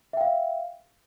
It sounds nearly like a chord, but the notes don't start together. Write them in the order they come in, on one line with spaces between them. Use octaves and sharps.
E5 G5 F5